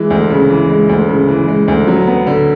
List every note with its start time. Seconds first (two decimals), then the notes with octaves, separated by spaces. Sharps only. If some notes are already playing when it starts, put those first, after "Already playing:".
Already playing: E3 G#3
0.10 D2
0.30 C#3
0.50 E3
0.70 G#3
0.89 D2
1.09 C#3
1.28 E3
1.48 G#3
1.68 D2
1.87 F#3
2.07 B3
2.27 D3